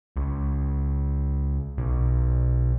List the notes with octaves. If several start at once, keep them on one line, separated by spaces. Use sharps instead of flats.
C#2
B1